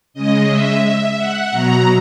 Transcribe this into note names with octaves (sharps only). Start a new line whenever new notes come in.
C#3 G#3 D#5
E5
F#5
B2 F#3 A#5